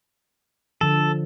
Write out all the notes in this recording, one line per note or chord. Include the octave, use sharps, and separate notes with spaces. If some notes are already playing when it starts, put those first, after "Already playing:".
D3 F3 A4